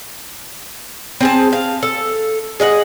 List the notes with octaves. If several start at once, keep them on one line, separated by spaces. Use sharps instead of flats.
C4 G#4 A5
F5
A4
G#4 D#5 F5 F#5